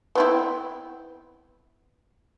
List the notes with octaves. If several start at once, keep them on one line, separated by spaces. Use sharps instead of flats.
B3 C4 E4